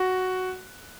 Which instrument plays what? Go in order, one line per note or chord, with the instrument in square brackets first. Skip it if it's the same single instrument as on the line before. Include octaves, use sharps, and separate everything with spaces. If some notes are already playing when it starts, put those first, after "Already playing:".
Already playing: [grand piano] F#4